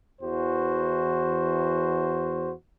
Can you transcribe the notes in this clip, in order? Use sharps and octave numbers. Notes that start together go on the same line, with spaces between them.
E2 E3 F#4 C5